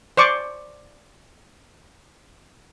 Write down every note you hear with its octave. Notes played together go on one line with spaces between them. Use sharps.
C5 D5 C#6 D6